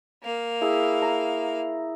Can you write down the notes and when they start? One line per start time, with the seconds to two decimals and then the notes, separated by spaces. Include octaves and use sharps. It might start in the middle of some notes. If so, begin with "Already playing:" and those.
0.23 A#3 F5
0.61 E4 G#4
1.02 A#5